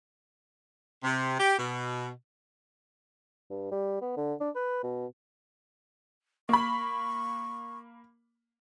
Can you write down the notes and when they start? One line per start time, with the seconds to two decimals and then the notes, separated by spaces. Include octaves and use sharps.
1.04 C3
1.40 G4
1.59 B2
3.50 G2
3.72 G3
4.01 B3
4.17 D3
4.40 D4
4.56 B4
4.83 B2
6.49 A#3 B5 C#6